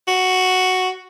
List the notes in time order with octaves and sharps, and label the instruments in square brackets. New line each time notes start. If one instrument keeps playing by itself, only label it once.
[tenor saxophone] F#4